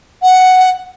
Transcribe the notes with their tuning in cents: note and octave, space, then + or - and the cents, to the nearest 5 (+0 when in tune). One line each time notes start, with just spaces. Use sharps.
F#5 +5